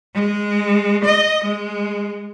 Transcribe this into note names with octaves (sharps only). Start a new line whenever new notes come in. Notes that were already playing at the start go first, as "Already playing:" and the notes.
G#3
D#5
G#3